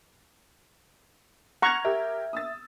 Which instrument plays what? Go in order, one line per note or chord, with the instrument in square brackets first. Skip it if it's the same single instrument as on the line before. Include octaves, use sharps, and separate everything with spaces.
[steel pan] F#5 A#5 C#6 [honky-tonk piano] F6 G#6
[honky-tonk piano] G4 A#4 [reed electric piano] E5
[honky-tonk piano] D#6 E6 A6